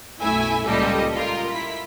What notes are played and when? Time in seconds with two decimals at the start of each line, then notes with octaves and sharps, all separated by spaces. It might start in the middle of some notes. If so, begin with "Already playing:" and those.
0.21 B1 F#2 A3 E4 E5 G#5
0.67 C#2 A#2 G3 G4 A4 D#5
1.15 F4 A#4
1.50 E4 B6